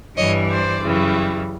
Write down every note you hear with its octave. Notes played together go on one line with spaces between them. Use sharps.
G2 E3 G3 C#5 D#5
C5 D5
F#2 C#3 E3 G3